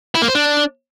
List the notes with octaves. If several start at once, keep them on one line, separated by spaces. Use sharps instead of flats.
E4
A#3
C5
D4